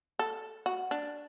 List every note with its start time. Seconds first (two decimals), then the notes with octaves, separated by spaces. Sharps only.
0.19 A4
0.66 F#4
0.91 D4